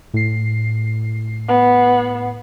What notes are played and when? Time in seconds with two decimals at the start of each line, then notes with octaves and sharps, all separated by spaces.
0.14 A2 C7
1.48 B3